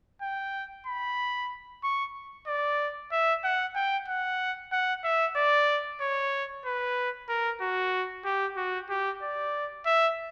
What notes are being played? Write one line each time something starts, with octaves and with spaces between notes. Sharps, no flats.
G5
B5
C#6
D5
E5
F#5
G5
F#5
F#5
E5
D5
C#5
B4
A#4
F#4
G4
F#4
G4
D5
E5